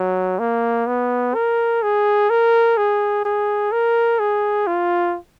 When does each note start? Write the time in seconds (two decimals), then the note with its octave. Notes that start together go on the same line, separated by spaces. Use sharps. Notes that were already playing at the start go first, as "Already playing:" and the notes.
Already playing: F#3
0.39 A#3
0.87 B3
1.35 A#4
1.82 G#4
2.30 A#4
2.77 G#4
3.25 G#4
3.72 A#4
4.19 G#4
4.67 F4